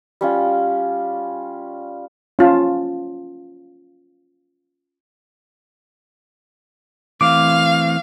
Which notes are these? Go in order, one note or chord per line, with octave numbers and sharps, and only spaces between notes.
G3 C#4 F4
C#4 F4 A5
E3 A3 C4 F5 D6